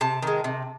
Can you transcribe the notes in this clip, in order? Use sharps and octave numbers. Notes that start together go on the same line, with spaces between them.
C3 A5
D#3 G#3
C3